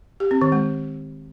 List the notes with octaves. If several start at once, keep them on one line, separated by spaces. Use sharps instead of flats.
G4
C4
D#3
G#3